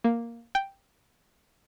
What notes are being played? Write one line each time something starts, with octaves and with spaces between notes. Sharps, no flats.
A#3
G5